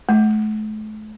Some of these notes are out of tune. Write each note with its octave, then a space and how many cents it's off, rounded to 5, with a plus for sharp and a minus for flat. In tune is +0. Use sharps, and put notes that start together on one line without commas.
A3 -40